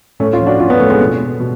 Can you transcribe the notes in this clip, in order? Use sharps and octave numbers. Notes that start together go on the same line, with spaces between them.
A2 A3 C#4
C#4 F4
F3
D4 F#4
A2 C#4 F4
B3 D4
F3 A3 C#4
G#3 B3
B2
B2